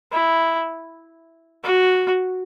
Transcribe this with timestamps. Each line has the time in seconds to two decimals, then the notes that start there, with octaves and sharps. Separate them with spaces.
0.12 E4
1.64 F#4